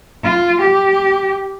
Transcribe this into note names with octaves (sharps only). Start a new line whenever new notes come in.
F4
G4